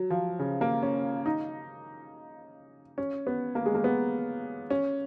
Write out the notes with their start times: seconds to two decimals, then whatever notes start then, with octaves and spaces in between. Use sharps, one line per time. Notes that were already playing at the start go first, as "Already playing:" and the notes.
Already playing: F#3
0.10 F3
0.39 C#3
0.61 A#3
0.83 C#4
1.26 D#4
2.98 C#4
3.27 B3
3.55 A#3
3.66 G#3
3.75 A#3
3.84 B3
4.70 C#4